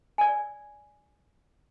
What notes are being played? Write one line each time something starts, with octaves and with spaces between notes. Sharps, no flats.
D5 G#5